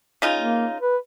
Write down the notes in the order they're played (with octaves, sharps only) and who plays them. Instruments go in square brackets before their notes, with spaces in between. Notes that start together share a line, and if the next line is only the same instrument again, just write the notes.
[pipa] C#3 D#4 F4
[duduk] A#3
B4